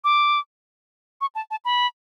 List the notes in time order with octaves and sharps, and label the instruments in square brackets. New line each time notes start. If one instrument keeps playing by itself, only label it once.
[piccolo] D6
C#6
A5
A5
B5